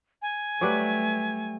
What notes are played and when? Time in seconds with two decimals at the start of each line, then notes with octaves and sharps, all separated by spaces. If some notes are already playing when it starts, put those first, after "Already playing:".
0.22 G#5
0.61 F#3 G3 A3 B4